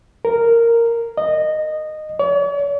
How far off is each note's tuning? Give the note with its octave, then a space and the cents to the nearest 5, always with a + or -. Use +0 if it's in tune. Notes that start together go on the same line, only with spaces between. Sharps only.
A#4 -5
D#5 -15
C#5 +45